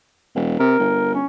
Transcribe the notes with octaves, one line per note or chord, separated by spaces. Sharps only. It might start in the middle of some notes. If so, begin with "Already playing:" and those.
E1
C3 A#4
G1
C#4